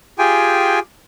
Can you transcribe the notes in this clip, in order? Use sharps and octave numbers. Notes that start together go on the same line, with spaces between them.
F4 G4 G#4 G5 G#5